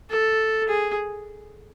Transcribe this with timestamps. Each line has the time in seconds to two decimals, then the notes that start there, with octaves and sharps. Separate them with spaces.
0.10 A4
0.68 G#4